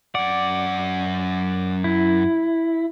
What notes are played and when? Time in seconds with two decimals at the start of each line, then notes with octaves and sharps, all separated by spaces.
0.15 F#2 D5 F#5
1.84 E4